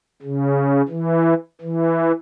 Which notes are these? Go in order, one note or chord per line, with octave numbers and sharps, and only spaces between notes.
C#3
E3
E3